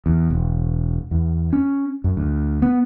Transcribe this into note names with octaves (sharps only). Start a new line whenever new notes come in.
E2
E1
E2
C#4
F#2
D2
B3